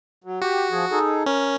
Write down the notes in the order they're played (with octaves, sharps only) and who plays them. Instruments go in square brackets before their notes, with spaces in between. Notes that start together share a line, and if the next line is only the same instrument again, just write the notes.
[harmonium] F#3
[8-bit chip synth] F#4 [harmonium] G4
[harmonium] F3 G#4
D#4 G#4 A4
[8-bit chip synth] C#4 [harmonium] A#4